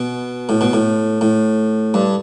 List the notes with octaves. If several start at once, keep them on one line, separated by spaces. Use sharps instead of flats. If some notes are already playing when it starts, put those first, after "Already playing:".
Already playing: B2
A2
B2
A2
A2
G2